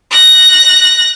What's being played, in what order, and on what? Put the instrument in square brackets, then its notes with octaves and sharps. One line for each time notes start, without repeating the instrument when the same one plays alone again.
[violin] F#6 A#6